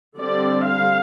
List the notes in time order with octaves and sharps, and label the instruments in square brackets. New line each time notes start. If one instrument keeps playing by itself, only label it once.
[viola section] D3 G3 C4 D5
F5